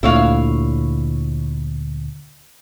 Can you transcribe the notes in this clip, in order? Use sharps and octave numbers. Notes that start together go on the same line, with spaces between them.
D2 A#2 D3 E4 C#5 F5